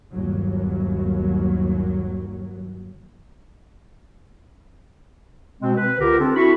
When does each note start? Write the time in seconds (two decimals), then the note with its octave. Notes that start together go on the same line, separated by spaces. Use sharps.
0.12 G1 D#2 F#3
5.61 B2 G#3 C4
5.77 B4
6.00 C#2 D3 G4 A#4
6.20 C4 D4 F4 A4
6.35 E4 F#4 B5 C#6